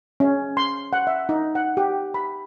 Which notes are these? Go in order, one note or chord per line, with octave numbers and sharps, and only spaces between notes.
C#4
C6
F#5
E5
D#4
F#5
G4
B5